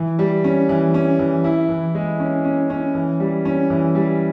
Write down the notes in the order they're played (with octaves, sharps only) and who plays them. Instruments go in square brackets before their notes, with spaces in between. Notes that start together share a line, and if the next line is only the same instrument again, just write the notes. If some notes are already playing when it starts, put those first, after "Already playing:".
Already playing: [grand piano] E3
G3
C#4
E3
C#4
E3
E4
E3
G#3
C#4
C#4
C#4
E3
G3
C#4
E3
G3